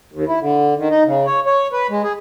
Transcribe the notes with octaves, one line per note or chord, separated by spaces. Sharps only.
D#2
E4
D3
D#3
D#4
C#3
C#5
C#5
B4
G#3
G#4